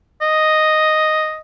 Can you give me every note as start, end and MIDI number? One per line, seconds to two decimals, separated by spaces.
0.22 1.40 75